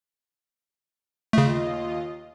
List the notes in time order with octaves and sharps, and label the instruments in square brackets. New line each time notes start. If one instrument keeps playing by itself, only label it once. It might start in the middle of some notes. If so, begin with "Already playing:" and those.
[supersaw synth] D#2 F4 D#5 [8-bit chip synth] C#3 A3